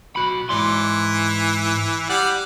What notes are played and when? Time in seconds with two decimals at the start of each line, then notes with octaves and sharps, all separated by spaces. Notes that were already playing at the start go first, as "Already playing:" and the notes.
0.16 B1 F#4 B5
0.49 G#2 E3 D5 C6
2.10 G3 D5 F#5